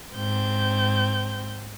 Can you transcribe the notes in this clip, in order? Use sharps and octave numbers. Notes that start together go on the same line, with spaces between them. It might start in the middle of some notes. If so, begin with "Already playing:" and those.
G#2 C4 G6